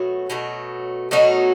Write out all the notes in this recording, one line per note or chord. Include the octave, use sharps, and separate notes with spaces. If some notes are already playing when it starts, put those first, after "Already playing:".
Already playing: B2 F#3 A3 F#4
B2 F#3 A3
B2 F#3 A3 D#4 F#4